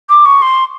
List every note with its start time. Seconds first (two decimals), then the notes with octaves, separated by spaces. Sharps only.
0.09 D6
0.26 C#6
0.42 C6